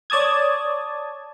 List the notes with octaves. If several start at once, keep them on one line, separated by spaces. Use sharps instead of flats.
C#5 D5 A5 D#6 G#6